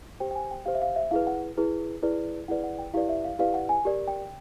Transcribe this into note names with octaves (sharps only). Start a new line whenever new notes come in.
G4 C5 G5
G5
G#5
G5
G4 C5 F5
E5
F5
E5
E4 G#4 B4 F5
F#5
E4 G#4 B4
E4 G#4 B4 D5
E4 G#4 B4 D5 F#5
F#5
G5
E4 G4 B4 D5 F5
E5
F5
E4 G4 B4 D5 F5
F#5
G#5
G4 A#4 D5
G5